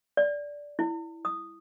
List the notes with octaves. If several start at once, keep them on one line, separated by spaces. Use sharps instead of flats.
D5
E4
D#6